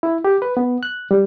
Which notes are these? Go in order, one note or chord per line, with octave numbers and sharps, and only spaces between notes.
E4
G4
B4
B3
F#6
G3